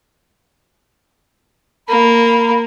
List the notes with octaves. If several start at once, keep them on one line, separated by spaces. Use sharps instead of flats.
A#3 B5